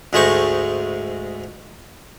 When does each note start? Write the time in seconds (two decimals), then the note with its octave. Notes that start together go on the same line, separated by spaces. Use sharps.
0.13 D2 G#2 G#3 A3 D#4 C#6